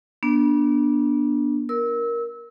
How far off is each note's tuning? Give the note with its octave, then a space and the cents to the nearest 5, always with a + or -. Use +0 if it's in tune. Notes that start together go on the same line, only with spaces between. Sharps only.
B3 -35 D4 +0
A#4 +10 E6 -25